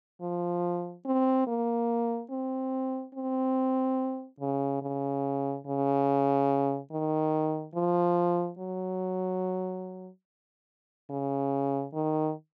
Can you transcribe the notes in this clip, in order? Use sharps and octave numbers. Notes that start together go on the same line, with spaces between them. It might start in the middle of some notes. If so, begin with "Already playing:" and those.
F3
C4
A#3
C4
C4
C#3
C#3
C#3
D#3
F3
F#3
C#3
D#3